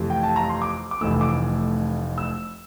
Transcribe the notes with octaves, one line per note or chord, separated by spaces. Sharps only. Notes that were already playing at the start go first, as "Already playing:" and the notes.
Already playing: F2 C3 E3 A3
G5
A5
A#5
C6
D6
D6
F1 F2 E3 A3 E6
D6
E6